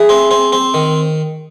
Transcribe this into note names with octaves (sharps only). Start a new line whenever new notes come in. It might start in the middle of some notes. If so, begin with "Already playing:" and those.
Already playing: E4 G#4
C4
C4
C4
D#3